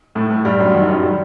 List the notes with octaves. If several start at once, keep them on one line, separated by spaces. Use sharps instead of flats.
A2 A3
A2 A3
G2 G3
F#2 F#3
D#3
G3
F#2 F#3
G3